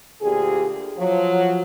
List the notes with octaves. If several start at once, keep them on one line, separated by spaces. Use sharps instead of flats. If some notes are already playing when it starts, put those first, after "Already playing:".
D2 A#2 G4 G#4
F3 F#3